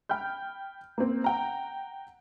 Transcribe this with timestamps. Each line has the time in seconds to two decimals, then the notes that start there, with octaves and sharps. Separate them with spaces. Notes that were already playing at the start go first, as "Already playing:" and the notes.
0.09 G5 B5 F6 G6
0.98 A#3 C4
1.24 F#5 G5 A#5